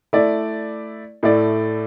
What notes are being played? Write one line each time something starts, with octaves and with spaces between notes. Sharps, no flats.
A3 E4 D5
A2 A3 E4 D5